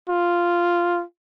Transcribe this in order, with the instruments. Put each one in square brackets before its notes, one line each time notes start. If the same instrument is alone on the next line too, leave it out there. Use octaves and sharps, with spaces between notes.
[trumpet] F4